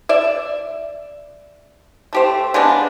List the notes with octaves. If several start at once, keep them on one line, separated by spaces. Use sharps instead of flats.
D5 E5
A3 G4 C5
C#3 G#3 B3 D4